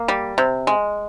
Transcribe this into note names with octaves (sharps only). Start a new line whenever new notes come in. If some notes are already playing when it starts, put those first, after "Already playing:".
Already playing: A#3
G3
C3
G#3